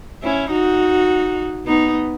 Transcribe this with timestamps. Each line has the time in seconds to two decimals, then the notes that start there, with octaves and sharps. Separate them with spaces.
0.23 C#4 E4
0.51 D#4 F#4
1.67 B3 D#4